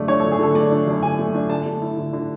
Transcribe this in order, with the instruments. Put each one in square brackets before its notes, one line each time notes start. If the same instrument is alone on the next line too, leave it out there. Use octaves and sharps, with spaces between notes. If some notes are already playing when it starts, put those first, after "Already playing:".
Already playing: [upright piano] F#2 D3 A3 D5
D4 C#5
A4
F#2
G#4
D3 A4
A3 D5
D4
F#2
D3 G#5
A3
D4
D3 A5
A3
E4
D3
D3